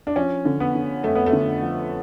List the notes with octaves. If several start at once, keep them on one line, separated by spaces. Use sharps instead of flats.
D4
F3 C#4
D3
B3
D3
F2 A3
B3
A3
D3
F3